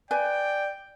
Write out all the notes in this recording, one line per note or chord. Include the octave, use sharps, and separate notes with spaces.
B4 D5 G5 G#5